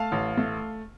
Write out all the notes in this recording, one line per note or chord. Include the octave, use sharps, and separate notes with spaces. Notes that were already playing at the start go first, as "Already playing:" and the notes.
Already playing: A3 F5 A5
A1
A3